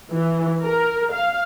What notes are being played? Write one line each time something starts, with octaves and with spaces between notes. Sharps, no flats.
E3
A#4
F5